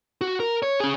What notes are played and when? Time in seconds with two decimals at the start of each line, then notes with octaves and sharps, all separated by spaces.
0.21 F#4
0.40 A#4
0.63 C#5
0.80 C#4 G#4